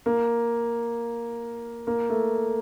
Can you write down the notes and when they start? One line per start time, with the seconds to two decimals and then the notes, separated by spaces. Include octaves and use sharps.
0.06 A#3
1.87 A#3
2.09 A3